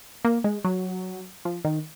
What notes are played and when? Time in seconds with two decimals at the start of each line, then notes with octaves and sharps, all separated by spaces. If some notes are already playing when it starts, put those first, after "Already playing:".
0.25 A#3
0.44 G#3
0.65 F#3
1.45 F3
1.65 D#3